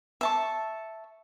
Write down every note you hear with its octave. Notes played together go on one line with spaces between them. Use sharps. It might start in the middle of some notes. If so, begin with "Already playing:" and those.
E5 A5 C#6